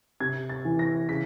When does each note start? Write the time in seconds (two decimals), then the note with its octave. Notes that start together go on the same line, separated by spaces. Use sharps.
0.20 C3 G#6
0.49 A6
0.65 E3
0.79 A#6
1.09 C#3 B6